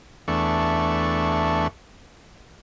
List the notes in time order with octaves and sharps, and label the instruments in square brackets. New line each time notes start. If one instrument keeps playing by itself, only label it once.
[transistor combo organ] E2 A3 D4 C#6